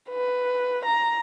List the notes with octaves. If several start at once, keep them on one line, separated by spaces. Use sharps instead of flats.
B4
A#5